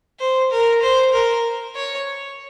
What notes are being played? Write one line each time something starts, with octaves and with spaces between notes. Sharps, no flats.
C5
A#4
C5
A#4
C#5